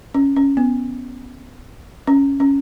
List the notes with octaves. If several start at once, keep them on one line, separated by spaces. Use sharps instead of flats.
C#4
C#4
B3
C#4
C#4